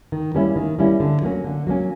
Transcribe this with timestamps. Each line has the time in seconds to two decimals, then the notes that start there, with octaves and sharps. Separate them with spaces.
0.12 D#3
0.35 G3 A#3 C#4 E4
0.56 D#3
0.79 G3 A#3 C#4 E4
1.00 D3
1.22 F#3 A#3 C#4
1.44 D3
1.67 F#3 A#3 C#4